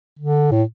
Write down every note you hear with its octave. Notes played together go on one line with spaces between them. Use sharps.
D3
A2